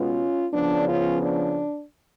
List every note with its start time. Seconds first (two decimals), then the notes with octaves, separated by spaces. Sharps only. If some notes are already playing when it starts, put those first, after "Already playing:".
Already playing: B2 G#3 B3 C#4 F4
0.54 C#3 F3 B3 D4
0.88 C#4 F4
1.23 D4